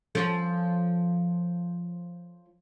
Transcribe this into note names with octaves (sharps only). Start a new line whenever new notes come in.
F3 C#4 A4